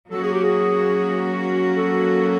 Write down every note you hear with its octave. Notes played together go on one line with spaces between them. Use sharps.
F#3 A#3 C#4 F#4 A4
G#4
G4
G#4
A4